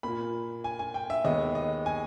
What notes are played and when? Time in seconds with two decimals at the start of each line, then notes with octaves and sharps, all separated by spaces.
0.03 A#2 A#3 B5
0.64 G#5
0.79 G#5
0.94 G5
1.10 E5
1.25 D#2 D#3 G#3 B3 D#5
1.55 D#5
1.86 G#5